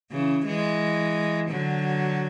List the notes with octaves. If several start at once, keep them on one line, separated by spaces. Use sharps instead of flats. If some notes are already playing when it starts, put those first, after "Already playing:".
C#3 E3
E3 G#3
D3 F#3